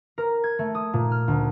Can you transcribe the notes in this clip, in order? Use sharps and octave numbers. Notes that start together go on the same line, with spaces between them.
A#4
G#6
A3
D#6
A#2
F6
D2